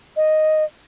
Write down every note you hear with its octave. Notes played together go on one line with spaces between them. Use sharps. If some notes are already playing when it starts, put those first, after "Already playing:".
D#5